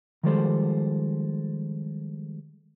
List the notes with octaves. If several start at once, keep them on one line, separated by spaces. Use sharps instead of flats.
D#3 F3 G3 G#3 A4 C5